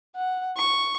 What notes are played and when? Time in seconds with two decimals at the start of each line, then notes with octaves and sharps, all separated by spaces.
0.15 F#5
0.57 C#6